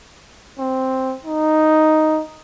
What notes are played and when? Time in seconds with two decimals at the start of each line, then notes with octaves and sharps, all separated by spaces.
0.59 C4
1.25 D#4